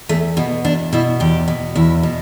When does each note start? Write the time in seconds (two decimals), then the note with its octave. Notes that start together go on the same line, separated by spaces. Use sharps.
0.09 E2 A3
0.37 B2 B3
0.64 E2 D4
0.93 B2 E4
1.20 E2 G4
1.48 B2
1.76 E2 E4
2.03 B2